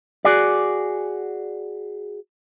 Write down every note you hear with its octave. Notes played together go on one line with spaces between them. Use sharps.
F#4 G#4 D5